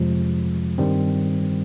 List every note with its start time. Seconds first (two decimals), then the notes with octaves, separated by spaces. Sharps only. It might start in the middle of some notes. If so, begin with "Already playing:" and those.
Already playing: F2 C3 F3 G#3
0.78 G2 D#3 G3 C4